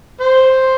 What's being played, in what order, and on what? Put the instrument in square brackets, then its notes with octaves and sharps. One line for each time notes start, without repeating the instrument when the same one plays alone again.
[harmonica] C5